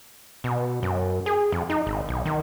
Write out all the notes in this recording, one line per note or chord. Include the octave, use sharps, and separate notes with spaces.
B2
F#2
G#4
F2
D#4
G#1
B1
D#3